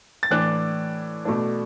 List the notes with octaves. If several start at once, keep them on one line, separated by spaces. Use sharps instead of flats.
A6
A2 E3 D4 F#6
B2 A3 D4